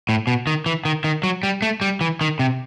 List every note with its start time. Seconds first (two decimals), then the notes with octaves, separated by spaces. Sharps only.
0.09 A2
0.27 B2
0.47 D#3
0.66 E3
0.85 D#3
1.04 D#3
1.23 F#3
1.43 G3
1.62 A3
1.81 G3
2.01 E3
2.21 D#3
2.39 C3